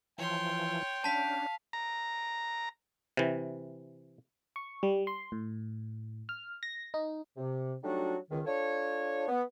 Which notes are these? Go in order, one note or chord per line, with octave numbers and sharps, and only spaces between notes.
E3 F3 C#5 G5 C6
C#4 D4 F5 A5 B6
A#5
C3 E3
C#6
G3
C6
A2
F6
A#6
D#4
C3
F#3 G3 A3 D4 D#4 F#4
C#2 D#3
D4 F4 A4 C#5
B3